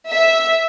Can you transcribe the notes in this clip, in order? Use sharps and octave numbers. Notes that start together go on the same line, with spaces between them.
E5